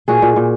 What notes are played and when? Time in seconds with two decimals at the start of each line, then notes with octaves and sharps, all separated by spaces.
0.08 A#2 F#4 G#4
0.22 A#2
0.36 A#2